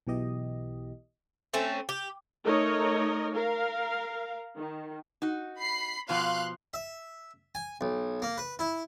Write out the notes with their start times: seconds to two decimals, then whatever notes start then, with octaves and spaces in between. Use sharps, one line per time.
0.07 B1 B2 E3 G4 D#5
1.54 A3 C4 C#4
1.89 G4
2.45 A3 D#4 A#4 C#5 D#5
3.35 A#4 F5
4.58 D#3
5.22 D#4 F#4
5.59 B5 C7
6.09 B2 F3 F5 C6 F#6
6.74 E5
7.55 G#5
7.81 B1
8.22 A#3
8.38 B4
8.59 E4